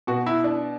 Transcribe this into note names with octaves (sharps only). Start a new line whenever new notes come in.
B2 F#4
E4
D4